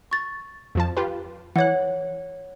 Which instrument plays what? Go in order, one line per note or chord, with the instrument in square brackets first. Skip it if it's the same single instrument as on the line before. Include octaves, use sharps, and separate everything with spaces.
[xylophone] C#6 A6
[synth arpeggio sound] F2 F3 A5
F4 G4 B4
[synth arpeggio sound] E3 F#6 [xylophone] C#5 F#5